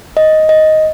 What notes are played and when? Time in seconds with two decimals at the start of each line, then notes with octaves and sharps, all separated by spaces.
0.17 D#5
0.49 D#5